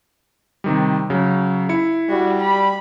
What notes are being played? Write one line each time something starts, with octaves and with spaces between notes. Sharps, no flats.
C3 D#3 G3
C#3 F#3
E4 C#7
G3 F#4
B5